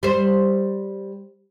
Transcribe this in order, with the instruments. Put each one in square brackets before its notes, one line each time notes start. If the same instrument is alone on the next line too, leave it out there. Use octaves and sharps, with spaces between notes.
[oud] G3 C5